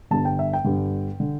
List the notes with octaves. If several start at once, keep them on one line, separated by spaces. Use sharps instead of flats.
G1 G2 D3 A5
G5
E5
G5
G1 G2 D3
D3